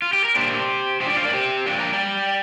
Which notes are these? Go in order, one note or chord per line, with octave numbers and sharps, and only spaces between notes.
F4
G4
A#4
A#2 A#3 D4 G4 C5
F3 G4 C5
D4 D5 G5
C5 F5
A#4 D5
G4 C5
F3 A#3 D4 G5
A#5
D5 G5